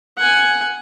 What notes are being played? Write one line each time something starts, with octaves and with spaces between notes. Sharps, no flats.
F#5 G#5